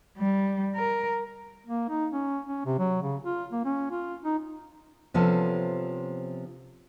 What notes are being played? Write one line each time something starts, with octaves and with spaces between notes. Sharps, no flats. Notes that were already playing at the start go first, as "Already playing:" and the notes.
G3
A#4
A#3
D#4
C#4
C#4
C3
F#3
C#3
F4
A#3
C#4
F4
D#4
C3 F3 B3 C#4 A4